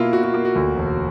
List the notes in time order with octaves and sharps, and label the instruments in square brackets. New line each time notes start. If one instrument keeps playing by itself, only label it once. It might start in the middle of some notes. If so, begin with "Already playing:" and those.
Already playing: [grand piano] B2 A#3 E4 F4
B2 F#4
F#4
A#3 F#4
F#4
D2
E1